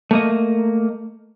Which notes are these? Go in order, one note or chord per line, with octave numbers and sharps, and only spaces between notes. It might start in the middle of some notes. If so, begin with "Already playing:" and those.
A3 A#3 D#5